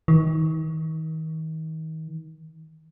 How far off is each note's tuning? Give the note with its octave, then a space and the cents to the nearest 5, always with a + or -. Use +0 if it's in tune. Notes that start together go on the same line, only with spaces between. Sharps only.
D#3 +35